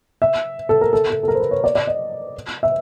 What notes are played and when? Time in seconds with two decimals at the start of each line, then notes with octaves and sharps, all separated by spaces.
0.22 E5
0.69 A4
0.81 A#4
0.93 A4
1.10 A4
1.23 A4
1.28 A#4
1.35 C5
1.40 B4
1.51 C#5
1.64 D5
1.75 D5
1.87 D#5
2.63 E5